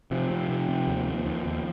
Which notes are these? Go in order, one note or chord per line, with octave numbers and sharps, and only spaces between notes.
C3 F3
C3
C3
C3
D#2
D#2
D#2
D#2